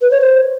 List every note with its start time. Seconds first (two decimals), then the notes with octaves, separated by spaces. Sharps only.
0.02 B4
0.11 C#5
0.20 C5